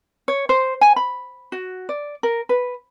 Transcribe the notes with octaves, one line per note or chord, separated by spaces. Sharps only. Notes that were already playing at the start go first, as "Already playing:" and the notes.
C#5
C5
G#5
B5
F#4
D5
A#4
B4